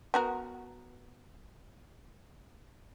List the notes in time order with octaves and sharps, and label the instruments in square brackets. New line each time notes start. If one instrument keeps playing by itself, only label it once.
[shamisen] B3 F#4 A#4